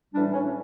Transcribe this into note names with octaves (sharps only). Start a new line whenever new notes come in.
A2 E3 G3 D4
C#4